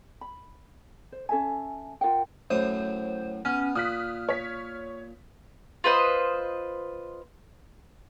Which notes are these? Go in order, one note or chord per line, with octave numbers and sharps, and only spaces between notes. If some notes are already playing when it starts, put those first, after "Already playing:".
B5
C5
C#4 A4 E5 G#5
F4 A#4 F#5 G5
F#2 A2 C5 D#6
B3 C#4 F6
A#2 D#6 F6 F#6 B6
C#5 B6
F4 B4 C5 D#5